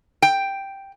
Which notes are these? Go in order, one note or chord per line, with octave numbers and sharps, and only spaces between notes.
G5